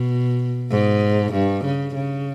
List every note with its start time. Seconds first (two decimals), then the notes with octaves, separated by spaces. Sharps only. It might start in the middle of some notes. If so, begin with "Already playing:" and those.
Already playing: B2
0.71 G#2
1.33 G2
1.65 C#3
1.95 C#3